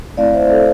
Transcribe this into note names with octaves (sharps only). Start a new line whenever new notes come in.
A3 C4 E4 D5 F5
C5 E5
A4 C5